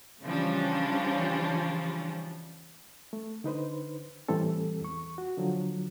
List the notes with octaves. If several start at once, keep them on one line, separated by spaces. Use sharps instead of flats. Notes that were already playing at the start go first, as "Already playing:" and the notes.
C#3 E3 F3 G3 C#4 D4
A3
D3 D#4 B4 C5
A2 E3 G3 C4 A4
E2 C#6
F#4
D3 F3 F#3